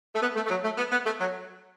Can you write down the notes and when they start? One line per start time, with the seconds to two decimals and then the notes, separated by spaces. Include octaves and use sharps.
0.14 A3
0.22 B3
0.36 A3
0.46 A3
0.50 F#3
0.64 A3
0.77 B3
0.92 B3
1.06 A3
1.20 F#3